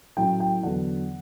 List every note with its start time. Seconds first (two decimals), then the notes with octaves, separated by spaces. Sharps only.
0.17 A2 F#3 C#4 E4 G5
0.40 G5
0.63 E2 D3 F#3 B3 D4 F#5